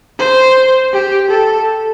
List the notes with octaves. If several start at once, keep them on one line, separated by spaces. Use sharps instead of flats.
C5
G4
A4